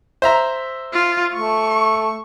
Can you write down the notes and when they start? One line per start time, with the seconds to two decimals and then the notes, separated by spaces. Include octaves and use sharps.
0.22 C5 E5 A#5
0.93 F4
1.34 A3 C#6